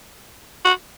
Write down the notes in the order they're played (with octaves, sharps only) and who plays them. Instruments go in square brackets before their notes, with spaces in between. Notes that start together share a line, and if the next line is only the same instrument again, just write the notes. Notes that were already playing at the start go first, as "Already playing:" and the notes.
[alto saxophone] F#4